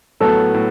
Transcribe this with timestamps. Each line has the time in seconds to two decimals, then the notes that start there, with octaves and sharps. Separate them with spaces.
0.20 A2 F#3 B3 A4
0.54 A2